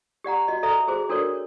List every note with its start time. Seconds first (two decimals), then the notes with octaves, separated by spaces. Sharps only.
0.24 G4 D5 F#5 A#5
0.48 F#4 D#5
0.63 A4 D5 E5 A#5
0.88 F#4 G#4 C5 D6
1.09 D4 F#4 A4 A#4 C#5 D5